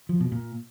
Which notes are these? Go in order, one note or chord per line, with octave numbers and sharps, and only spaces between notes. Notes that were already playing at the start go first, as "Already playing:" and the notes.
F3
B2
A#2